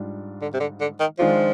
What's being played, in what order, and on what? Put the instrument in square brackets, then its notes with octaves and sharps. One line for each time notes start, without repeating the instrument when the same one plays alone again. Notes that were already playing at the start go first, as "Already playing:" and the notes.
Already playing: [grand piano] G#2 G3 D4 F4
[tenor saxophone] D3
C3
D3
D3
D#3
[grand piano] D#3 G#3 D4 F4 [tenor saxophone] F3